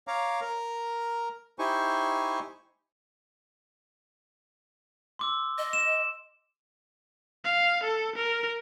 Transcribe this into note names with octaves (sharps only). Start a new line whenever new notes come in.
C#5 F5 A#5 D6
A#4 A#5
D#4 E4 G4 C5 G#5 C#6
C6 D6 E6
D#5
E7
F5
A4
A#4